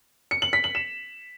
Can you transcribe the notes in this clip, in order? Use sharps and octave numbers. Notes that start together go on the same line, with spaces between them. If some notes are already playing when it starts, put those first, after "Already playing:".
C#7
F#7
B6
F#7
E7